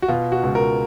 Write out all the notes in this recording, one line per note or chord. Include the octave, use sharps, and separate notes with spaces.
F#4
B2 F4
F#4
C#2
A#4